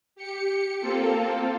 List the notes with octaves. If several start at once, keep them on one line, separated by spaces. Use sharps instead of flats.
G4 C#7
A#3 C4 F4 A4